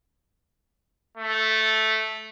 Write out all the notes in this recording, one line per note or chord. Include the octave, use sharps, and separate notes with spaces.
A3